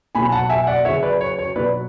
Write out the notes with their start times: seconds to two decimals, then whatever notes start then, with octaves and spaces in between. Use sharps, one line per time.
0.15 B2 G#5 B5
0.18 F#3
0.32 F#5 A5
0.49 E5 G#5
0.67 D5 F#5
0.85 C#3 F#3 C#5 E5
1.03 B4 D5
1.21 C#5
1.39 C#5
1.56 B2 F#3 B4 D5